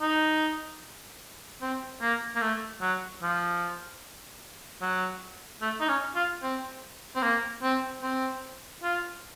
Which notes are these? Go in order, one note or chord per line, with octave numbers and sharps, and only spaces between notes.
D#4
C4
A#3
A#3
A3
F#3
F3
F#3
A3
D#4
C#4
F4
C4
C4
A#3
C4
C4
F4